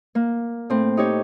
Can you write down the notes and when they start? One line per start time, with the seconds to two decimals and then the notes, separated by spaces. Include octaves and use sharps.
0.15 A#3
0.70 A2 A3 C4
0.97 D#4 G4 C#5